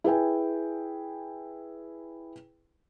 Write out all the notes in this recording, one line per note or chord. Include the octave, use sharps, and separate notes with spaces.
E4 G#4 B4 G5 G#5